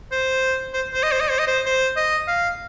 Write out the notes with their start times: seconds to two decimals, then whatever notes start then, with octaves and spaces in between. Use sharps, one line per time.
0.12 C5
0.74 C5
0.94 C5
1.03 D#5
1.12 C5
1.21 D#5
1.30 C5
1.39 D#5
1.48 C5
1.66 C5
1.97 D#5
2.28 F5